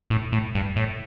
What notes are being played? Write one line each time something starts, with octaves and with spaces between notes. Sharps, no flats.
A2
A2
G2
A2